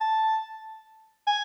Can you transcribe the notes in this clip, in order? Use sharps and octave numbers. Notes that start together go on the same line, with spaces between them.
A5
G#5